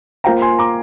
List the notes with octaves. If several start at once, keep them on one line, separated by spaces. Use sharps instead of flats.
A#3 F4 C5 F5 G5 A#5
G#5 C6
A#5 D6